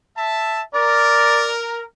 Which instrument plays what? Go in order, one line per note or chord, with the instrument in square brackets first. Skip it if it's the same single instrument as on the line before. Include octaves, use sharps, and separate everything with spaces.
[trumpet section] E5 A5
[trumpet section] A#4 [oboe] D5